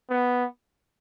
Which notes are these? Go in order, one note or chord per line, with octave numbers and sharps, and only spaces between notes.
B3